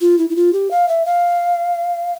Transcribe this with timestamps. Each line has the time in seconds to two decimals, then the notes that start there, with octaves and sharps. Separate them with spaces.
0.01 F4
0.18 E4
0.30 E4
0.36 F4
0.53 G4
0.71 F5
0.88 E5
1.06 F5